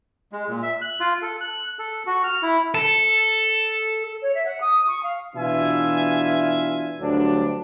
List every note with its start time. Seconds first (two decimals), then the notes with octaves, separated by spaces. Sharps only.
0.32 G#3
0.49 A#2
0.62 E5
0.81 F#6
1.00 F4
1.22 A4
1.41 F#6
1.79 A4
2.07 F#4
2.24 F6
2.43 E4
2.75 A4
4.22 C#5
4.34 E5
4.45 F#5
4.60 D#6
4.87 C#6
5.03 F5
5.35 B2 E3 D4 F4 E5 G#5
7.01 D2 G2 F#3 D4